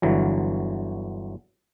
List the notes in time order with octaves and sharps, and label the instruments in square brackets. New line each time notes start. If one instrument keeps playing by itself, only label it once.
[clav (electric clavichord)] G1 D3 E3 F#3